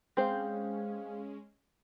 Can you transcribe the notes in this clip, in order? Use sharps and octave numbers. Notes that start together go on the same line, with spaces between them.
G#3 C4 C#4 G#4 C5 F5